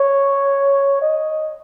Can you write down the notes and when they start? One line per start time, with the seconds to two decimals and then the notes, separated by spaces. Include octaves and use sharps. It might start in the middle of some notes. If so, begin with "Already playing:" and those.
Already playing: C#5
1.02 D#5